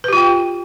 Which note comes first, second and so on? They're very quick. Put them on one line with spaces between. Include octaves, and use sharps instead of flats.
B4 G4 F4 G5